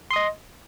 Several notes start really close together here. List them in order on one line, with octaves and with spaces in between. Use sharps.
C6 D#6 D#5